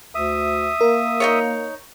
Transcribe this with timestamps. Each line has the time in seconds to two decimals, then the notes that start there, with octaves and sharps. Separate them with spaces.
0.15 D2 E5 D#6
0.81 A#3 A#4
1.20 D#4 F4 C#5